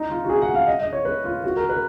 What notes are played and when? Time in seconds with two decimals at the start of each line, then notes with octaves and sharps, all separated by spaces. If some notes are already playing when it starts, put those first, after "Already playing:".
Already playing: D#4
0.10 F4
0.24 F#4
0.29 G#4
0.42 F#5
0.54 F5
0.67 D#5
0.80 D#5
0.92 C#5
1.05 B4
1.24 F4
1.44 F#4
1.56 A#4
1.69 B4